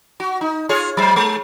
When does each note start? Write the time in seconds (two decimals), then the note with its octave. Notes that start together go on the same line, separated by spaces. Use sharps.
0.20 F#4
0.41 D#4
0.69 F4 G#4 C#5
0.97 F#3 C5
1.16 G#3